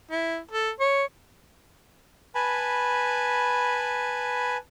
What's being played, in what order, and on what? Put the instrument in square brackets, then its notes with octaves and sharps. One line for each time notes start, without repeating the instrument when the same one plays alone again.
[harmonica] E4
A4
C#5
[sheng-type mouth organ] B4 G#5 A5 B5